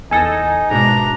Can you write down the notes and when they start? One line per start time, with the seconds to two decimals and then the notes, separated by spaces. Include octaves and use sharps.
0.11 E2 D#4 A4 G#5 A#6
0.71 G#2 B2 D4 A#5